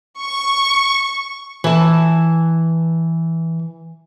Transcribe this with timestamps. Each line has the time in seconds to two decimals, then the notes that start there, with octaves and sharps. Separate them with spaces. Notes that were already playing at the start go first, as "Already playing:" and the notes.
0.20 C#6
1.64 E3 A5